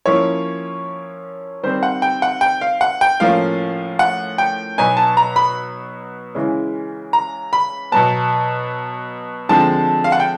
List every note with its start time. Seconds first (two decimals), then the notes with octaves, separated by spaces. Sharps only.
0.06 F3 A#3 C#4 E4 C#5
1.63 D#3 G3 C4 C5
1.83 F#5
2.02 G5
2.22 F#5
2.41 G5
2.61 F5
2.81 F#5
3.01 G5
3.20 A2 F3 A#3 C#4 F5
3.99 F#5
4.38 G5
4.78 B2 F#3 B3 D#4 G#5
4.97 A5
5.17 A#5
5.36 B5
6.35 C#3 E3 G#3 C#4 E4
7.13 A#5
7.53 B5
7.92 B2 F#3 B3 A5
9.49 D3 F3 G#3 C4 A5
10.04 F5
10.12 F#5
10.20 G5